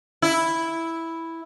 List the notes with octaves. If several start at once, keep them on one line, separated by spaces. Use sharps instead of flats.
E4